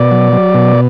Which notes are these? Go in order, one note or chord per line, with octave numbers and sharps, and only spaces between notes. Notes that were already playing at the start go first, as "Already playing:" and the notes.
Already playing: B2 D5
F#3
F#3
B2